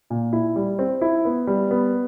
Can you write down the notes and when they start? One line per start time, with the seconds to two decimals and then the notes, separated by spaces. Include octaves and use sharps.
0.10 A#2
0.33 E4
0.56 G3
0.79 C4
1.01 E4
1.25 B3
1.47 G3
1.71 B3